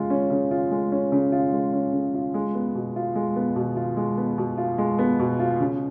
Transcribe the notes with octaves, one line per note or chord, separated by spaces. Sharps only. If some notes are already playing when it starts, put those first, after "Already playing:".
Already playing: C#3 G#3 F4
C#4
C#3
F4
G#3
C#4
C#3
F4
G#3
C#4
C#3
F4
G#3
B3
B2
F4
G#3
B3
B2
F4
G#3
B3
B2
F4
G#3
B3
B2
F4
C#3